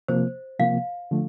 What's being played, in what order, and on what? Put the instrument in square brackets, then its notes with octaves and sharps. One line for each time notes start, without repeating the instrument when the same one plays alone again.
[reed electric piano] C3 F3 A#3 [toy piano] C5
[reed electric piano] C3 F3 A#3 [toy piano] F5
[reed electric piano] D3 F3 A3